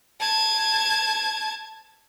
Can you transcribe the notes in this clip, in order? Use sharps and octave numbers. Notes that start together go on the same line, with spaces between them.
A5 G#6